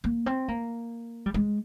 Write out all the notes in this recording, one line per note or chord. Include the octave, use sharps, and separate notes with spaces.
A#3
C4
A#3
G3
G#3